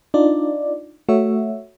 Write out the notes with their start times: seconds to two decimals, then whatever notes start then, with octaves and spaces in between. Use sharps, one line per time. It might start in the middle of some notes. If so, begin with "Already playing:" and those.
0.14 D4 D#4 F4 D5
1.09 A3 F#4 C#5 E5